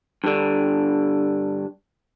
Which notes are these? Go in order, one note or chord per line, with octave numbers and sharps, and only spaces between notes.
G2 D3